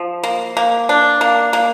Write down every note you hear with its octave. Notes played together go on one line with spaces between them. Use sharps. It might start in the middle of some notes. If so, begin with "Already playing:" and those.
Already playing: F3
A#3
A#3
D4
A#3
A#3